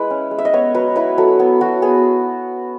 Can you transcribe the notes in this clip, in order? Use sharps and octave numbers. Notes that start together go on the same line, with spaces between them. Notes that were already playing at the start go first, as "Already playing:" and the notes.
Already playing: G#3 E4 B4
C#4
G#3
E5
D#5
B3 C#5
F#3 B4
E4 B4
F#3 A4
B3
F#3 F#4
B3 G#4